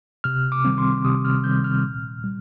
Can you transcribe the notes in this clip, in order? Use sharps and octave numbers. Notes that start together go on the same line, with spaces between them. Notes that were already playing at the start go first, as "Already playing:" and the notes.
C3 F6
D6
D#3 G3 C4
C6
C3 D#6
F6
D#3 G3 C4 G6
F6
A#2
G3